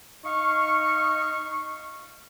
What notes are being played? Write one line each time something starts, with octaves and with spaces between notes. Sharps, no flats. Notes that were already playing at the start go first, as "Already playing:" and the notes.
D#4 F5 C#6